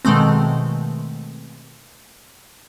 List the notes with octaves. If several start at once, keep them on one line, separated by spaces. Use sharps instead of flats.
B2 D#3 G#3 A3 C4